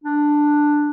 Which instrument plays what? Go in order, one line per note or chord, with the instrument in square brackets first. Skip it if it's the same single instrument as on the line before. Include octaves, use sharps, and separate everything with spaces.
[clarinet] D4